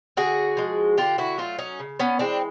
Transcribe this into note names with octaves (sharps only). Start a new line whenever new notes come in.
D3 F#4 G#4
F3 G#3
D3 F4 G4
E4 F#4
F#3 A3 D#4 F4
C#4 D#4
C#3
B3 C#4
E3 G#3 C4 D4